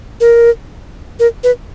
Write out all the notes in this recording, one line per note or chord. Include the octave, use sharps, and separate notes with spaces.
A#4
A#4
B4